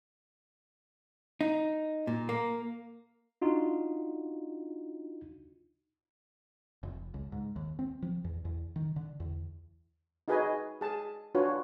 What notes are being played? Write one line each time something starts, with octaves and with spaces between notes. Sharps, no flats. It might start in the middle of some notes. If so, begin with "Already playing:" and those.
D#4
A#2
A#3
D4 D#4 F4 F#4
F1
C#2
G#2
D#2
C4
F3
E2
E2
D#3
D3
E2
D#4 F#4 G#4 B4 D#5 G#5
G#4 A5
D4 F4 F#4 B4 C#5